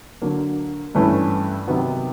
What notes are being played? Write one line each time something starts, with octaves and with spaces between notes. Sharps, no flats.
D3 F#3 A#3
G2 E3 A3 C#4 E4
C3 D#3 F#3 B3